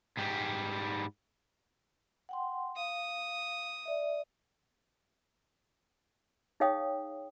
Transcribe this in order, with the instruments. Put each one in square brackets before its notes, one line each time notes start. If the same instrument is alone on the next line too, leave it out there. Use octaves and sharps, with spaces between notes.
[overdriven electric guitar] G#2 G3
[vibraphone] F#5 G5 C6
[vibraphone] F5 [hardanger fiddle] D#6
[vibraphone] D5 E5
[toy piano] D#4 G#4 C#5 F5 G5 D#6